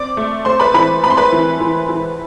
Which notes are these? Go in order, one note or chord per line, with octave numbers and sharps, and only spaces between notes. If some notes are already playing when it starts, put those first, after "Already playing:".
Already playing: C4 D5 D6
A3
A3 C5 C6
B4 B5
E3 B4 B5
C4 B5
C6
B4 B5
E3
E3
E3